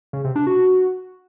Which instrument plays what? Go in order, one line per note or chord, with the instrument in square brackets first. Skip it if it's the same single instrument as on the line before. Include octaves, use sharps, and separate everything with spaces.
[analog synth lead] C#3
C3
D4
F#4